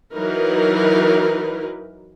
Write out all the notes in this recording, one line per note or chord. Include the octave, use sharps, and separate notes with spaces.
E3 F#3 D#4 A#4 B4